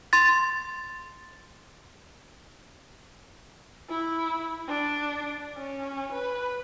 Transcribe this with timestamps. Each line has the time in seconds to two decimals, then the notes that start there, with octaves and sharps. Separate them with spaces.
0.13 C6 A6
3.89 E4
4.68 D4
5.57 C#4
6.12 B4